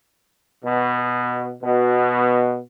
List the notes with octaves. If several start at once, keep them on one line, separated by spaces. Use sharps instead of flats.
B2
B2